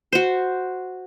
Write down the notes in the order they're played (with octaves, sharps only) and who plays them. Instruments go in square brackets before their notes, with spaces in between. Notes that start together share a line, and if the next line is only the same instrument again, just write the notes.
[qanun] F#4 C5